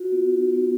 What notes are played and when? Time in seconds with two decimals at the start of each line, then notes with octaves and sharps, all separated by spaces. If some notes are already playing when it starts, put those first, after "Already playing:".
Already playing: F4 F#4
0.12 B3
0.31 D#4
0.49 B3